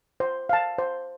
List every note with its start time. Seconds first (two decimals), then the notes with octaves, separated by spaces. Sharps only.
0.20 C5
0.49 F5 A5
0.78 C5